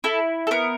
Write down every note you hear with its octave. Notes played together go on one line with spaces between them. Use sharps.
E4 A4
A4
B3 A#4